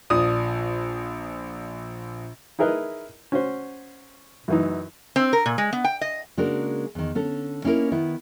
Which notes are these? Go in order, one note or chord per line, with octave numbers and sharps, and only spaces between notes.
A#1 F3 D5 D#6
D#4 E4 G#4 A#4 B4 D#5
C#4 F#4 C5
F#2 E3 D#4
C4
A#4
A#2
G#3
B3
G5
D#5
C#3 G#3 A#3 D4 F#4 A#4
E2 D#3
D3 C#4 A4
A#3 C#4 D#4 E4 G#4 A#4
D#3 B3 E4